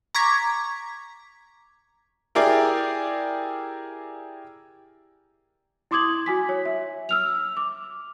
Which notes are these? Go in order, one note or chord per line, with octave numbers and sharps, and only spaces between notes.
A#5 C#6 D6 G#6 B6
E4 G4 G#4 A#4 D5
E4 C6 D6 D#6 G#6 F#7
F#4 G#5 B6
C#5
E5
E6 F6 F7
D6